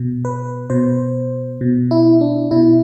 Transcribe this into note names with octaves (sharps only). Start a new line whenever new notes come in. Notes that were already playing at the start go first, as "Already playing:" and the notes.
Already playing: B2
B4
B2 C5
B2
E4
D4
B2 E4